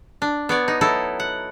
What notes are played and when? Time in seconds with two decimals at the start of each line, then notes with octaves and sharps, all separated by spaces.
0.22 D4
0.49 B3 C#5 D5
0.68 D#4
0.81 F#3 D#4 E4 A4
1.20 F#5